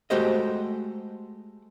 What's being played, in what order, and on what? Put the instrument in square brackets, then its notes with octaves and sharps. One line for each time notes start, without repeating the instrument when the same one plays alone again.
[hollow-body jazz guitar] G#3 A3 F#4 G4 C5 D#5